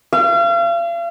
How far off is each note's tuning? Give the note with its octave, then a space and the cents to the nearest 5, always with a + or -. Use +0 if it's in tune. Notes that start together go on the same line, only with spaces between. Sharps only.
F5 -40